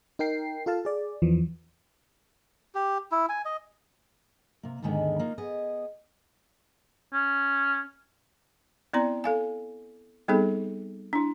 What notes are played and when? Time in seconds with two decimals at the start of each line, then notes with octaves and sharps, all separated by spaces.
0.19 D#4 A#4 G5 C7
0.66 F4 A4 F5 A5
0.85 G#4 D5
1.22 E2 E3 F3
2.75 G4
3.12 E4
3.29 G#5
3.45 D#5
4.63 C3 A#3
4.82 D#2 G#2 D3 D#3 G#3 B3
5.19 A#3 D#4 F4
5.38 B3 G#4 D#5
7.14 C#4
8.93 B3 C4 E4 D5 A#5
9.24 A4 F5 G#5
10.28 G3 B3 C4 D#4 G#4 A4
11.13 D4 E4